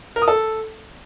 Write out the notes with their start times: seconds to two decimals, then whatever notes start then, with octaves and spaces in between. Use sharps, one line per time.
0.16 A#4
0.22 D#6
0.28 A4